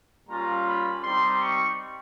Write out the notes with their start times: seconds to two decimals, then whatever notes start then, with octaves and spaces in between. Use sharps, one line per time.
0.28 G3 A#3 C#4 F4 A#5
0.66 B5
1.03 G3 C4 D#4 G4 C6
1.41 C#6